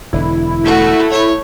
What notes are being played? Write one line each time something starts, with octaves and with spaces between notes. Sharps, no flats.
E1 D3 E4
A3 F#4
C#5